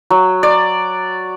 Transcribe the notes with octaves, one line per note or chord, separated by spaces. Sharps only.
F#3
D5